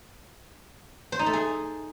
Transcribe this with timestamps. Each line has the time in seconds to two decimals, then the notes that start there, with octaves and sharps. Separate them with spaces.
1.12 C5
1.19 D#4
1.26 A3
1.33 G#4